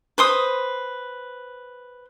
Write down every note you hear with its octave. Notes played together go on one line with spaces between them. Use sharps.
B4 C5 D#6